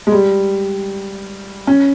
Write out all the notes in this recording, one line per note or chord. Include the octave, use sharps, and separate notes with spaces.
G#3
G3
C#4